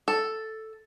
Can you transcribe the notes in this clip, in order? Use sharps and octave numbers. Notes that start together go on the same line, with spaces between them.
A4